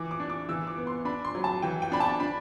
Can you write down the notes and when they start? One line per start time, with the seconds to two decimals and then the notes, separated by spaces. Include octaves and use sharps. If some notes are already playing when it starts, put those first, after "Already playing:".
Already playing: E3 D6
0.11 D6
0.20 D4
0.30 D6
0.49 E3 E6
0.67 D6
0.78 B3
0.87 C6
1.05 D4 B5
1.25 C6
1.35 F#3
1.44 A5
1.62 E3 G5
1.82 G5
1.92 D4 B5
2.00 A5
2.20 D4 B5